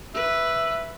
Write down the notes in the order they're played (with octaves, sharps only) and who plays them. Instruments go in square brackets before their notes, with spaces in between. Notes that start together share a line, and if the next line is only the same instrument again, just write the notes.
[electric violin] B4 [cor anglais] E5